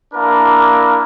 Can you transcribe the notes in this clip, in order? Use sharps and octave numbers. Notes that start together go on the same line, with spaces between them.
A#3 D4 E4 A#4